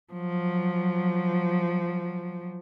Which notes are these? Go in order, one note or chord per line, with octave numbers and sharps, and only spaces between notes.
F3 F#3